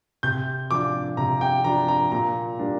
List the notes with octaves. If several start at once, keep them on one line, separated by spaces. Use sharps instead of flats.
C3 G6
F3 D4 D6
C3 A#5
G5
F3 D4 A#5
A#5
A#2 A#5
G3 A#3 D4